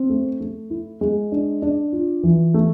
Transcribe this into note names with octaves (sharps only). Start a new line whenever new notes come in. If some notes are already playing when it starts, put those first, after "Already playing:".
Already playing: C4
A3
A3
E4
G#3
D4
D4
F4
E3
A3